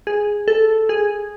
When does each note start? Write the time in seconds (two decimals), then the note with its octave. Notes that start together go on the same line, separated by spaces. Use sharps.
0.07 G#4
0.48 A4
0.89 G#4